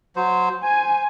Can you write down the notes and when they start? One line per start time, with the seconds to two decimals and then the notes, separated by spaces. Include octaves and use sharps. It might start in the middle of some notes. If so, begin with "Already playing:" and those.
0.16 F#3 C5
0.63 C5 G#5